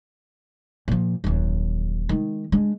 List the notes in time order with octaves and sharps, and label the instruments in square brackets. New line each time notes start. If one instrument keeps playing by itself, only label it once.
[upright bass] A#2 F3
D#1 F#2
D#3 G#3
G#3 D4